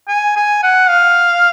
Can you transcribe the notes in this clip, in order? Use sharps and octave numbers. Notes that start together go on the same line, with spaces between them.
G#5
G#5
F#5
F5